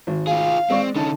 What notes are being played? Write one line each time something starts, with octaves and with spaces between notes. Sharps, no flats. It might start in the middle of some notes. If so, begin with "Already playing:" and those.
G#1
F4 G#4 F5
G#3 C4 D5 C#6
D3 C#4 D#4 A5